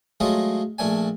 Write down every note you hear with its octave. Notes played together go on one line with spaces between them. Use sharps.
F#3 G#3 A3 F4 D#5
A#1 A3 D4 G#5